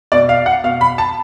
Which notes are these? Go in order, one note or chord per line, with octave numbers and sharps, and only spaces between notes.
B2 D5
F5
F#5
B2 F5
B5
A5